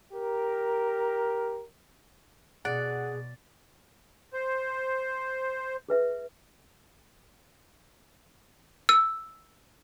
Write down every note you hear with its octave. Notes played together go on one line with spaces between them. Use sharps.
G4 A#4
B2 G#4 D5 F#5
C5
G#4 B4 E5
E6